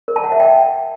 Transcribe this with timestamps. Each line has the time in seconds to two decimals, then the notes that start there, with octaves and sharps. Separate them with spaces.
0.08 A#4
0.16 A5
0.24 F#5
0.32 E5
0.40 G5